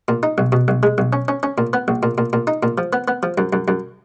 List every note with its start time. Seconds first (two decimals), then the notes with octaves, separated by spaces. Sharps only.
0.08 A#2
0.23 D#4
0.38 B1
0.52 B2
0.68 B1
0.83 G#3
0.98 B1
1.13 C#4
1.28 C#4
1.43 C#4
1.58 A#2
1.73 B3
1.88 A#1
2.03 A#2
2.18 A#2
2.33 A#2
2.47 D#4
2.63 A#2
2.78 F3
2.93 B3
3.08 B3
3.23 F3
3.38 F#2
3.53 F#2
3.68 F#2